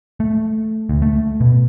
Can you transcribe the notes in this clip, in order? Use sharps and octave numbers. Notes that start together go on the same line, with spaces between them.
A3
D2
A3
B2